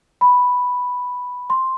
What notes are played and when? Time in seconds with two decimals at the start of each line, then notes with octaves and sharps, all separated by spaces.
0.21 B5
1.50 C6